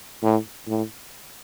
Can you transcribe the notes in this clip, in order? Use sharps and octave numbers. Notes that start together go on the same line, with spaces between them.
A2
A2